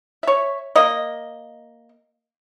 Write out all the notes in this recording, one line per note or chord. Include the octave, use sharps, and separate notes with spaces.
C#5 E5
A#3 D#5